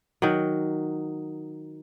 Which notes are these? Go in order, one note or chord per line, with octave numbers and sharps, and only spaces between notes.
D#3 F#3